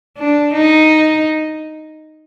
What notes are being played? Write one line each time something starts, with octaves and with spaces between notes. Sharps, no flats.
D4
D#4